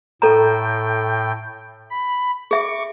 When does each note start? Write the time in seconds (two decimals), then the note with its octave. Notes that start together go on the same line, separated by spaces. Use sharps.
0.22 A2 A4 G5 A#5
1.90 B5
2.51 G#4 E5 C#6 D6